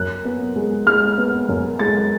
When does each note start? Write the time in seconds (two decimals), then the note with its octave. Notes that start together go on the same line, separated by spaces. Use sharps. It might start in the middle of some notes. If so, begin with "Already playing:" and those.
Already playing: F#2 F#6
0.25 B3
0.56 G#3
0.86 G#3 F6
1.18 B3
1.49 F#2
1.79 G#3 A6